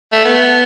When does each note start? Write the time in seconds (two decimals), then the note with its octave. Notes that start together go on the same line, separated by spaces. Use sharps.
0.12 A3
0.25 B3